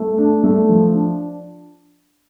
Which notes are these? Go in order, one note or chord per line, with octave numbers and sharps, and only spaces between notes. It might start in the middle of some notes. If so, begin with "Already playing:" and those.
Already playing: A3
D4
A3
F3
D4